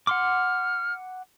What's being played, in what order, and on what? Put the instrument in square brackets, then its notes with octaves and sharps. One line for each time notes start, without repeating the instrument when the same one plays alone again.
[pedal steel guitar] F#5 C6 D6 [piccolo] F6